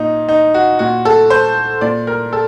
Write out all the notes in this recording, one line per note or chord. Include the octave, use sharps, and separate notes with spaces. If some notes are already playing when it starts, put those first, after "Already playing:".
Already playing: A#2 D#4
D#4
F#4
A#2 F#4
A4
C5
A#2 D5
A#4
A4